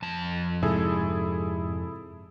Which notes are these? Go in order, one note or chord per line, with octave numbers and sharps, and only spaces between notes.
F2 A5
G#2 C3 E4 G#4 A4